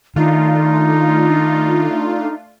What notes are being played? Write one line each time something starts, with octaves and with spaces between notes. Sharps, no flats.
D#3 A3 D4 D#4 F4